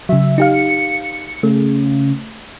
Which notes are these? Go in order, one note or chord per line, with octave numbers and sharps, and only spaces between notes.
C#3 F#3 E5
D#4 G4 F5 C#7
C#3 A3